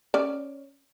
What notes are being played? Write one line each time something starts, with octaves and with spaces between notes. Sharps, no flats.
C#4 D5